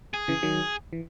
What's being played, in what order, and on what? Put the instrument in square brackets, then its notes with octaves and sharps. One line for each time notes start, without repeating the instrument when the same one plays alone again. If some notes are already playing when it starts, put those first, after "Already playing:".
[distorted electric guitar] G#4
[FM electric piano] C#3 E3
D#3 F#3
E3